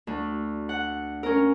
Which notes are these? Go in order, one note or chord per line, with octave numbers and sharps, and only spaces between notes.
D2
F#5
C#4 A#4